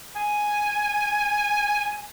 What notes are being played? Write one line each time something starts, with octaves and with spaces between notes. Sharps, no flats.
G#5